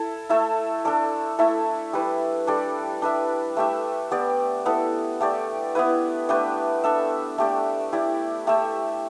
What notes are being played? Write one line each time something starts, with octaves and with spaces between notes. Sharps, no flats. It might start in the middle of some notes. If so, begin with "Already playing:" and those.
Already playing: E4 A4
A3 E4 A4 E5
D4 A4 D5
A3 E4 A4 E5
G3 E4 B4
G3 D4 A4 D5
D4 B4 E5
A3 G4 E5
B3 G4 D5
B3 E4 A4
A3 G4 D5
B3 E4 B4
A3 D4 G4 B4
D4 A4 E5
A3 G4 D5
E4 G4 D5
A3 G4 E5